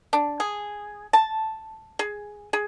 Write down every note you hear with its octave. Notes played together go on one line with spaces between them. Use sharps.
D4
G#4
A5
G#4
G#4